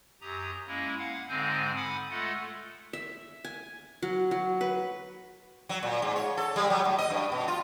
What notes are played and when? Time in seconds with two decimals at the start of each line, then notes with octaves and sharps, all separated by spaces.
0.21 F#2 G4 A#5 D#6
0.67 G#3 A#3 C#4 E4
0.98 F5 F#5
1.29 G#2 D3 G#3 C4 G#5 G6
1.76 F#5 G#5 B5 D6 D#6
2.10 G#3 A3 F4 A4 F#5
2.93 E5
3.44 G#5
4.02 F#3
4.31 F#3
4.61 B4
5.69 F#3
5.83 A#2
6.02 G#2
6.16 C#5
6.37 A4
6.56 G3
6.70 F#3
6.85 A2
6.98 D#5
7.10 G2
7.32 B2
7.48 F4